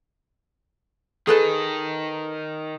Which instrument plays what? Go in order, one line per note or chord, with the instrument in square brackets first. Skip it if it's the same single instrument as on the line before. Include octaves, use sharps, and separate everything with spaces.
[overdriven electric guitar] D#3 [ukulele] G#4 A4 B4